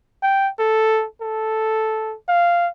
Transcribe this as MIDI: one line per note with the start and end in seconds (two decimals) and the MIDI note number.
0.23 0.49 79
0.59 1.06 69
1.22 2.16 69
2.29 2.69 77